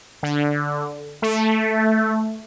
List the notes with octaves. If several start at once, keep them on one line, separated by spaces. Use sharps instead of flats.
D3
A3